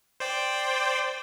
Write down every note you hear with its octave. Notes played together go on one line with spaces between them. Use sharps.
C5 D5 G5